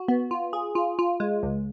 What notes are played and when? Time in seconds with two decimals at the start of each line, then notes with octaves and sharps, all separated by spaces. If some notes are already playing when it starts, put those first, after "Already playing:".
Already playing: F#4
0.08 B3
0.31 F4
0.53 G#4
0.75 F4
0.99 F4
1.20 G#3
1.43 C#2